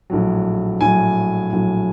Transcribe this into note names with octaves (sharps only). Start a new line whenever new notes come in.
A#1 A2 F#3
A#1 A2 F#3 G#5
A#1 A2 F#3